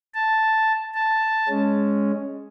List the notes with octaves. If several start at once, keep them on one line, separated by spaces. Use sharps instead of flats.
A5
A5
G#3 C#4